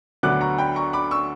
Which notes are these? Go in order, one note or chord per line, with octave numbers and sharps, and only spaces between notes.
D2 D3 F#3 B3 D6 F#6
A#5 C#6
G5 B5
A#5 C#6
B5 D6
C#6 E6